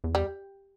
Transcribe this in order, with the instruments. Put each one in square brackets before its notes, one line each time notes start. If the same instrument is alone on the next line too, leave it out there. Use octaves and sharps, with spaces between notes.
[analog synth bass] E2
[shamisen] G3